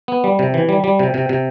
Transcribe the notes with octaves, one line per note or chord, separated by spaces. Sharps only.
B3
G3
C3
E3
G3
G3
C3
C3
C3